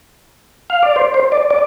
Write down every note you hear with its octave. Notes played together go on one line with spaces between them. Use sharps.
F5
D5
C5
C5
D5
D5